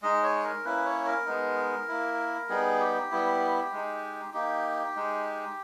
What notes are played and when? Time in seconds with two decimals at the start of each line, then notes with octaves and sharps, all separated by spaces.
0.02 G#3 D#4 D#5
0.23 C#5
0.44 A#4
0.65 A#3 C#4 E4 B4
0.85 C#5
1.05 A#4
1.26 G#3 B3 D#4
1.88 A#3 E4
2.49 G3 B3 D#4 G#4
2.81 G4
3.11 G3 B3 E4
3.72 G#3 D#4
4.34 A#3 D#4 G4
4.96 G#3 D#4